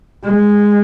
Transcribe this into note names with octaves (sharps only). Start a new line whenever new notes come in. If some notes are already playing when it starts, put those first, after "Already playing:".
G#3